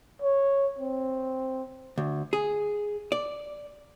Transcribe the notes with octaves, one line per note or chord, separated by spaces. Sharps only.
C#5
C4
D2
G#4
D5